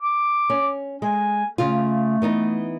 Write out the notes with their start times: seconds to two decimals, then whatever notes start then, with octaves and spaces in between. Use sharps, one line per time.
0.01 D6
0.50 C#4
1.02 G#3 G#5
1.58 C#3 A3 F4
2.22 E3 B3 D#4